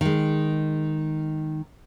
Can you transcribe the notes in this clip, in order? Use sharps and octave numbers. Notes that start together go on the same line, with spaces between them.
D#3 G#3